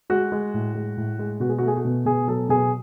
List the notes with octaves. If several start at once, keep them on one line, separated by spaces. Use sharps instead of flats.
G#3 F#4
G#3
A2
G#3
A2
G#3
B2 F#4
G#4
F#4
A3
G#4
F#4
B2
B2 G#4
F#3 A4
B2 G#4